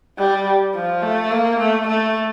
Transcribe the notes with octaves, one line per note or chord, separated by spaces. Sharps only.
G3
F3
A3
A#3
A3
A3